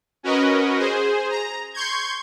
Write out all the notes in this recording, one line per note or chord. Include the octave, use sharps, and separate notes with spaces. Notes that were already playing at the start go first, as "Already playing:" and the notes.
C#4 F#4 A#4 B4 D#5
G#4 C5
A#5
C6 C#6 G6 G#6